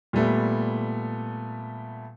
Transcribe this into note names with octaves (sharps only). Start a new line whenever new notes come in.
A#2 G3 A3 B3